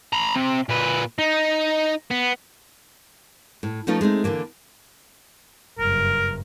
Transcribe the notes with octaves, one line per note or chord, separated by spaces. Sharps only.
A#5 B5
C3
A#2 B4
D#4
B3
A2
F3 A3 C#4 D#4 F4 B4
G#3 A3 C4 D#4
D3 E3 F#3 A#3
F#1 G2 A#4